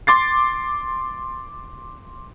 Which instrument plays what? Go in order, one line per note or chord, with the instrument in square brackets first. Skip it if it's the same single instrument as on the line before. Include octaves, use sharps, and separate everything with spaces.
[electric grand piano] C6 D6 A6 C7